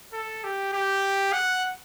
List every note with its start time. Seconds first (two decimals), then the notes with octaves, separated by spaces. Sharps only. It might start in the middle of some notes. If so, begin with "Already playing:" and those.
0.13 A4
0.44 G4
0.73 G4
1.33 F#5